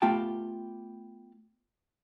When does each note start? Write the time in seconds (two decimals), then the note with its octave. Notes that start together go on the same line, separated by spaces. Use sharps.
0.02 A3 B3 F4 G4 G5 A5